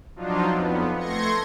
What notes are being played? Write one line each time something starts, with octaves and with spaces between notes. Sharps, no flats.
F3 F#3 D4 D#4 F4
F2 B3
A3 C6 G#6 A#6 C#7